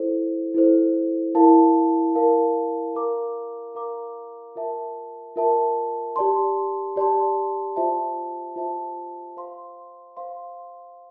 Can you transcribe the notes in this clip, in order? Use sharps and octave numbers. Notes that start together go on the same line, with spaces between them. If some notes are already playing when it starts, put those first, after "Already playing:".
Already playing: E4 A4 C5
E4 A4 C5
E4 A#4 F5 A5
E4 A#4 F5 A5
A#4 F5 A#5 D6
A#4 F5 A#5 D6
F4 A#4 E5 A5
F4 A#4 E5 A5
G4 D5 A5 C6
G4 D5 A5 C6
F4 C5 E5 A5
F4 C5 E5 A5
C5 F5 C6
C5 F5 C6